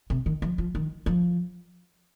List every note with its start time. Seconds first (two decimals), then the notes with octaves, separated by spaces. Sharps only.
0.10 C3
0.26 D#3
0.42 F3
0.58 F3
0.75 D#3
1.06 F3